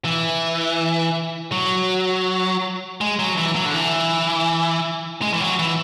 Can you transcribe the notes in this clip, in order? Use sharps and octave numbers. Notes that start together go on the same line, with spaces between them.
E3
F#3
G#3
F#3
E3
F#3
D3
E3
G#3
E3
F#3
E3